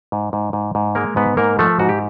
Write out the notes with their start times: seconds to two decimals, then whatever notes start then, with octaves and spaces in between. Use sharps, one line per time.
0.12 G#2
0.33 G#2
0.53 G#2
0.75 G#2
0.95 G#3 A#3 A#4
1.16 G#2 B3 B4
1.37 G#2 A#3 A#4
1.59 F3 A3 A4
1.79 G#2 F#4
1.89 G4